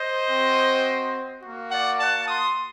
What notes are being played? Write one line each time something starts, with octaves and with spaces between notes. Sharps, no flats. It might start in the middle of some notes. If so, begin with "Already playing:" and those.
Already playing: C5 D#5
C4 F#4
A#3 F#4
D5 F#5
F#5 A5
C6 D#6